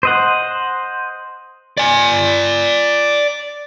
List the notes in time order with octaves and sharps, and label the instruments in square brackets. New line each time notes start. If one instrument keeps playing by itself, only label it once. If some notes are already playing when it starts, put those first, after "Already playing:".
[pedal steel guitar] C5 D#5 F#5
[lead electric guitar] D5 G#5